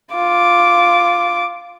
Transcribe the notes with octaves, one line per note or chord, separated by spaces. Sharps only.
F4 D6